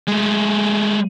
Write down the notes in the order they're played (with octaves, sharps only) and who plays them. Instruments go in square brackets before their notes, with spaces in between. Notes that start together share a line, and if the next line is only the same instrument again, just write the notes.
[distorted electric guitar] G#3 A3